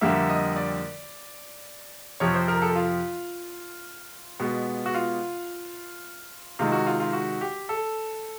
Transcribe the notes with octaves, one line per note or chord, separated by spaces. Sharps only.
F2 D3 G3 A#3 E5
D#5
D5
F2 C3 F3 C#5
C5
A#4
A4
F4
B2 G#3 B3
F#4
F4
C3 D#3 G#3 F4
F#4
F4
F4
F#4
G4
A4